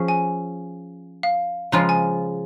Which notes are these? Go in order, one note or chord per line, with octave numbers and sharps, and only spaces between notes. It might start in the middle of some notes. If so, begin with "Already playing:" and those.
Already playing: F3 C#4 G#4
G#5
F5
C#3 F3 G#3 F4 A#5
G#5